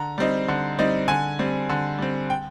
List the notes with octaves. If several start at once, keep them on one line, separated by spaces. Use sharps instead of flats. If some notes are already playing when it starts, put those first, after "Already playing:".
Already playing: D3 A#5
G3 C4 D#4
D3
G3 C4 D#4
D3 G#5
G3 C4
D3
G3 C4
G5